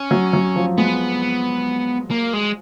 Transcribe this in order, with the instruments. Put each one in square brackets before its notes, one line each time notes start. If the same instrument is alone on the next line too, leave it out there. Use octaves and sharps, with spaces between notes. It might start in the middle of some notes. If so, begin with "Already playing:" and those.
Already playing: [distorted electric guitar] C#4
[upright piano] F#3
F#3
F3
[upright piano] G#3 [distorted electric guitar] B3
[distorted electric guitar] A#3
G#3